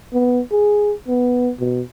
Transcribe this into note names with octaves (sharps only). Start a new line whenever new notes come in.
B3
G#4
B3
B2